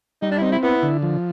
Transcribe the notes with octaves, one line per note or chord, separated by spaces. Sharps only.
G3 D#4
D4
E4
C4 D#4
E4
B3 E4
D3
F3